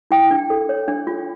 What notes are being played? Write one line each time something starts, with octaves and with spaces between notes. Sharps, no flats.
E4 G5
D4
A4
C#5
D4
F4